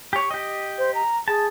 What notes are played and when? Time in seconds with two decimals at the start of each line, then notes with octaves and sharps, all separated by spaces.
0.13 G4 C#5
0.31 G4 D#5
0.78 C5
0.95 A#5
1.28 G#4 A5